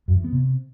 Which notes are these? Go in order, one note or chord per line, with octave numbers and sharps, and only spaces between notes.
F#2
E3
B3
C3